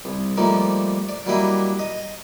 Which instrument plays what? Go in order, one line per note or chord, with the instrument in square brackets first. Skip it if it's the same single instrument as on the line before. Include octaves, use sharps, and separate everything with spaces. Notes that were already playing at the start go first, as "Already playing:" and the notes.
[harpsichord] C2
F3 G3 A3 A#3 D#4
D5
F#3 G3 A#3 E4 G4 D#5
D#5